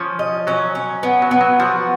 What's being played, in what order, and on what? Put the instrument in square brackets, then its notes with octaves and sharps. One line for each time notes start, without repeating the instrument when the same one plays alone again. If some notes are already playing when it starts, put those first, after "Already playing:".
Already playing: [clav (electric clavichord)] F3 [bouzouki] C#4
[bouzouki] D#5
[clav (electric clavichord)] F#3 [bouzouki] C#4
[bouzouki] C#4
B3
[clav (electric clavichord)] F#3
[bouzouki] B3
[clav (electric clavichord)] F#3
[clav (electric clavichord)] F3 [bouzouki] F#4